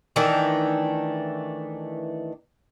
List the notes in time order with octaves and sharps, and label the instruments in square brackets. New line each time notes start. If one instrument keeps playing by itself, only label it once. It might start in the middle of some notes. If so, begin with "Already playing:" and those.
[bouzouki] D#3 E3 A3 D4